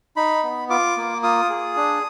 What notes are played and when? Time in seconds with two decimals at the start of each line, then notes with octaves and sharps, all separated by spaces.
0.16 D#4 B5
0.43 B3
0.70 F4 D6
0.97 A#3
1.23 F4 D#6
1.50 G#4
1.77 D4